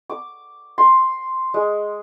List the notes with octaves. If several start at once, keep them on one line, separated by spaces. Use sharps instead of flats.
D6
C6
G#3